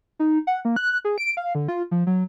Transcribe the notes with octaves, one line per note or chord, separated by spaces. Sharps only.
D#4
F#5
A#3
F#6
G#4
D7
F5
D3
F4
F3
F#3